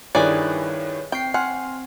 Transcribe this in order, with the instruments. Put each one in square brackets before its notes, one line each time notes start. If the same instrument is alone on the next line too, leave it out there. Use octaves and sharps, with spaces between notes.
[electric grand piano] G2 D#3 E4 [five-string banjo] G#4 D5 [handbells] B4 C#5 F#6
[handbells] C4 C7 [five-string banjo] G5
[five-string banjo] F#5 [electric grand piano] G#5 C6 F6